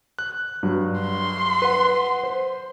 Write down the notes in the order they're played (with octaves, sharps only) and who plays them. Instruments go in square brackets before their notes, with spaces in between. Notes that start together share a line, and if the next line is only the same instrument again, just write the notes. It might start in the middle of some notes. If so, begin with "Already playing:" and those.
[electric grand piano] F#6
G2 F#3
[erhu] C6
[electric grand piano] B4 F#5
C5